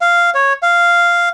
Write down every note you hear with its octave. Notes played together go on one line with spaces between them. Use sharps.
F5
C#5
F5